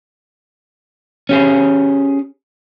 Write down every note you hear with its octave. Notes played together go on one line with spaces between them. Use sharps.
C#4 G4 G#4